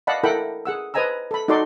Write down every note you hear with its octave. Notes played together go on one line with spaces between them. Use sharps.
D5 D#5 F5 F#5 A5 B5
E4 A4 A#4 F#5 G5 B5
G#4 F#5 E6
B4 C5 D#5 G#5 A#5 E6
A4 B5
D#4 F#4 A4 D5 C6 D6